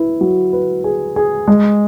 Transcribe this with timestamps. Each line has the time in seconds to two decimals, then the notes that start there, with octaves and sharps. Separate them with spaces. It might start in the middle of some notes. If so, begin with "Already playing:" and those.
Already playing: E4 B4
0.21 F#3
0.53 B4
0.84 G#4
1.16 G#4
1.48 G#3